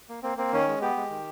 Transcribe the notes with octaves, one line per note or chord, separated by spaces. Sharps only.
A#3
A#3 C4
A#3 C4
D#3 C#4
G#3
B3 G4
G#3
D#3